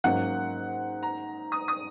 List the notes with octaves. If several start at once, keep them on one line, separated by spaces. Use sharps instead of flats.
G#2 F#3 A#3 C#4 F#5
A#5
D#6
D#6